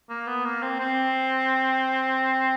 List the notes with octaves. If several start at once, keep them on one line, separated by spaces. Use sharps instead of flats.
A#3
B3
A#3
C4
C4